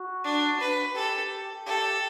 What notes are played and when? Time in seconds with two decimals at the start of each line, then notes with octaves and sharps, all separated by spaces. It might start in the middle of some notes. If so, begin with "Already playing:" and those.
Already playing: F#4
0.24 D4
0.60 B4
0.95 G4 A4
1.66 G4 A4